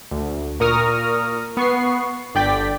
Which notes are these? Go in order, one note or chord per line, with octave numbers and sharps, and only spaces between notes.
D2
A#2 A#4 C#6 D#6 F6 A#6
B3 C#6 C7
G1 D3 D5 G5 A6 B6